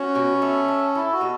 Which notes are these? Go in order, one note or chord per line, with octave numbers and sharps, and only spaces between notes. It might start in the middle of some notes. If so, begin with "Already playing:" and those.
Already playing: C#4 F#4
B2
A3
A4
E4 A4
F#4
B2